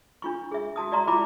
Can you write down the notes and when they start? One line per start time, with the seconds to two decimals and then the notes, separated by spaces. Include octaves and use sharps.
0.22 D4 F4 C#6
0.51 G#4 E5
0.76 F#4 A5 D#6
0.92 F#4 D5 E5 A#5 C6 C#6
1.08 E4 F4 A5 B5 D6